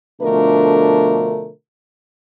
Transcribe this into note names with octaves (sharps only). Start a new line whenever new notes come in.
B2 D3 F3 A3 D4 A#4